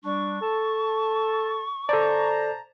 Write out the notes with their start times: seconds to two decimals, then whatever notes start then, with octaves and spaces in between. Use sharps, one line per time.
0.04 G3 D4 C#6
0.41 A4 A5
1.89 A4 C5 D5 A5 A#5